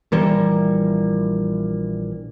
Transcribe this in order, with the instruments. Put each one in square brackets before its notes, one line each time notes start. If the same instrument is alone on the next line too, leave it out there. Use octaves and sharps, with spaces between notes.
[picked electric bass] A#1 E3 G3 A#3